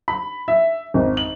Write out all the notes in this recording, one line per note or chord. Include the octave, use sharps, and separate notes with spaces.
B5
E5
G#1
F#7